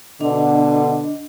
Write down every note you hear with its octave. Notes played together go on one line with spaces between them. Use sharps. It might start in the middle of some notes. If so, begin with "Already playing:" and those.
B2 D3 D4 D#5